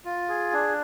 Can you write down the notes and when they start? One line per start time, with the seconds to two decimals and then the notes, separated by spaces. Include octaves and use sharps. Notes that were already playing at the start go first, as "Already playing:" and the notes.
0.05 F4
0.29 G#4
0.53 D4